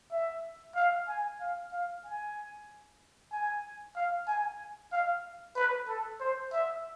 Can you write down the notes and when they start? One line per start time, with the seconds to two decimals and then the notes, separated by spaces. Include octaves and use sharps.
0.12 E5
0.75 F5
1.08 G#5
1.40 F5
1.72 F5
2.04 G#5
3.32 G#5
3.96 F5
4.28 G#5
4.92 F5
5.56 B4
5.88 A4
6.20 C5
6.53 E5